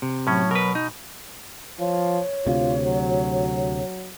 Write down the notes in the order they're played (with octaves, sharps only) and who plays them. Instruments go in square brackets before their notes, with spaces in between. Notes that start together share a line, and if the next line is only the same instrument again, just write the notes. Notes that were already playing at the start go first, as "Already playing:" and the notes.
[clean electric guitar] C3
[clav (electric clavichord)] A2 C#4 [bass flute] F#3
[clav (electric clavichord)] B2 [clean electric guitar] A#4 B4
[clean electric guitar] D#4
[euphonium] F3 [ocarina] C#5
[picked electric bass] D2 C3 [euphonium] F4
[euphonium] F#3